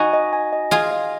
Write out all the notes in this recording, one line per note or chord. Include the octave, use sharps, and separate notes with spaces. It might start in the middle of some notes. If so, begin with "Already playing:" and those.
Already playing: D#4 F#4 G#5
D#5
G#5
D#5
F4 G#4 D#5
D#5